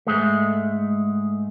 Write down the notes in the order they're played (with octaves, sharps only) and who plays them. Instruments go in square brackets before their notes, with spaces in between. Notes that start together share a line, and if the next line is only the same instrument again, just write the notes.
[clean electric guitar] G#2 G#3 A3